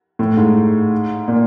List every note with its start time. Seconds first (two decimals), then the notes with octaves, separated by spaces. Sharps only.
0.19 A2
0.37 G#2
1.28 A#2